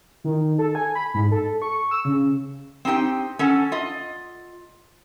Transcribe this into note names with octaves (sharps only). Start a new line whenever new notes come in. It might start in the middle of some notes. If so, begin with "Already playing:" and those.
D#3
A4
G#5
B5
G#2
A4
C#6
E6
C#3
C4 D#4 G4 G5
C#4 A4 F#5 A5
F4 D#5